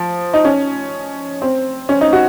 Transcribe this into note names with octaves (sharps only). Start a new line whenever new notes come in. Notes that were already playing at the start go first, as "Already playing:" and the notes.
Already playing: F3
D#4
C#4
C4
C#4
D#4
F#4